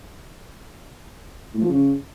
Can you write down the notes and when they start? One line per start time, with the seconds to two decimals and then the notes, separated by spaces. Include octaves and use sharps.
1.54 A2
1.61 F3
1.69 C#3